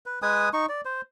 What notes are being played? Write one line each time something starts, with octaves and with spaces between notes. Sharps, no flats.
B4
G#3 B4 G#5 D#6
D#4 C#6
D5
C5